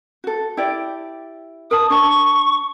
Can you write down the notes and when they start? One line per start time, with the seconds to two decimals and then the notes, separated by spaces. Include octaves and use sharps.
0.24 F#4 A4
0.57 E4 G4 D5
1.71 A#4 A5 D#6
1.90 D4 C#5 A5 C#6